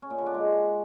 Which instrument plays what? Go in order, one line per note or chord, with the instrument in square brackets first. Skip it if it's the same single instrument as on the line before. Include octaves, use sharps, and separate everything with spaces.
[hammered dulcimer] C#4
A#2
D3
D4
G#3